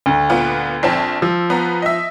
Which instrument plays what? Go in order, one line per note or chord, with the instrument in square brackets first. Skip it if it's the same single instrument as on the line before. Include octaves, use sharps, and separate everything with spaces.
[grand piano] D2
[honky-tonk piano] A#2 B3 F4
A#1 C4 A5
[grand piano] F3 [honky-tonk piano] E6
[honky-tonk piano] B3 A#5
D#5 E5